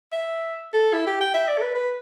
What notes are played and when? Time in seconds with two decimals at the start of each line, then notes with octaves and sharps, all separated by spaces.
0.12 E5
0.73 A4
0.93 E4
1.07 G4
1.21 G5
1.34 E5
1.48 D5
1.58 A4
1.62 B4
1.75 B4